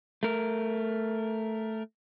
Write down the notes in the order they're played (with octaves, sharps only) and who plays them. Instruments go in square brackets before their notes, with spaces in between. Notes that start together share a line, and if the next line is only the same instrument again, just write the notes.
[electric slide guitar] A3 A#4